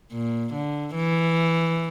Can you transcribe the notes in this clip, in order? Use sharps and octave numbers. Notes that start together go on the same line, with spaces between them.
A#2
D3
E3